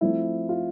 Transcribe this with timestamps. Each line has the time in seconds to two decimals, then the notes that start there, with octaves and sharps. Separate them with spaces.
0.01 F3 A3 C4 E4
0.49 F4